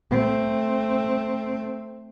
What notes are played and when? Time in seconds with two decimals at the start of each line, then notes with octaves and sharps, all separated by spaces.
0.11 A3 C4